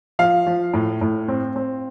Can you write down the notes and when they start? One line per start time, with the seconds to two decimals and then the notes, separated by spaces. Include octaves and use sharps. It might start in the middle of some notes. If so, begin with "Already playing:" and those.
0.19 F3 F5
0.47 F3
0.74 A2
1.01 A2
1.28 C4
1.56 C4